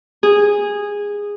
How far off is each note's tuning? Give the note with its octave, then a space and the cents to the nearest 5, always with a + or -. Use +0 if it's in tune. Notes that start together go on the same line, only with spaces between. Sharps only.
G#4 -15